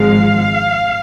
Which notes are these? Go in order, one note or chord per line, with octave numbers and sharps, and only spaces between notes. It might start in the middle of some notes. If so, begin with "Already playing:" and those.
Already playing: G#1 G#2 F3 G#3 F5